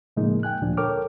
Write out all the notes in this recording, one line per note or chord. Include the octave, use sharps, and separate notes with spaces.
A2 C#3 F3 G#3 A#3 D#4
G5 G#5 F#6
D2 A#2 D3 F3 D4
A4 A#4 C#5 G5 D6 F6